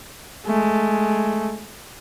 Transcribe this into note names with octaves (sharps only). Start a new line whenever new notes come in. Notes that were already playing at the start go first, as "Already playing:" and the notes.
G#3 A3